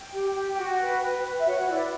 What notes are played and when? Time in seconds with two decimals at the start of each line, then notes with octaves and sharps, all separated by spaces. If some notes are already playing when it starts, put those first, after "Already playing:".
Already playing: G5
0.12 G4
0.36 G4
0.58 F#4
0.80 B4
1.02 B4
1.24 B4
1.39 E5
1.46 F#4 C#5 F#5
1.61 C#5
1.69 E4 D5